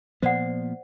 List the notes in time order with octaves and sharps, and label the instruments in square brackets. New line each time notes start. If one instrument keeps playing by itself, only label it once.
[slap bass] A#2 F3 B3 [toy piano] C5 D5 F#5